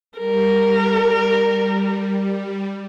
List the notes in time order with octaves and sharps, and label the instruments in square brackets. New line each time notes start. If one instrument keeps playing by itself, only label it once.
[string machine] G3 [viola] A#4